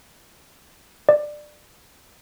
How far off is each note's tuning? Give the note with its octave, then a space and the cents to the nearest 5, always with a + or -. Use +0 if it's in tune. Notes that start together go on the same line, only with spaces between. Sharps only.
D5 +20